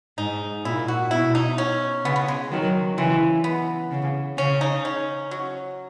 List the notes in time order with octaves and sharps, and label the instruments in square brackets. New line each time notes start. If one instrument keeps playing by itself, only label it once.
[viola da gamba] G#2 [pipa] D#4
[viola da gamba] A#2 [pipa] E4
[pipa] F#4
[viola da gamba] B2 [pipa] E4
[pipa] D#4
C#4
[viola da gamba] C#3 [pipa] B3
[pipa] B3
G#3
[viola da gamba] D#3 F#3
[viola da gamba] C#3 E3 [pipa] G#3
[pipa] B3
[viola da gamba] C#3
[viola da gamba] C#3 [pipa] C#4
[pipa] D#4
C#4
F#3